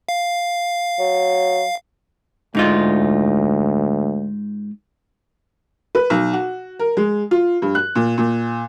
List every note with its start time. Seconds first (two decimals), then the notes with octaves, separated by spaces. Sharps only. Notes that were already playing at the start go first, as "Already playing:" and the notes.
0.09 F5
0.99 F#3
2.55 D2 G#2 D#4 F4
5.95 B4
6.10 B1
6.33 F#4
6.79 A#4
6.97 G#3
7.31 F4
7.62 G2
7.75 F#6
7.95 A#2
8.18 A#2